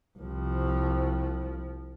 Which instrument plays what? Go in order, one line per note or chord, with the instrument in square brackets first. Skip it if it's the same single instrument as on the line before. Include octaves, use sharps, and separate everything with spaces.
[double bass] C2 F3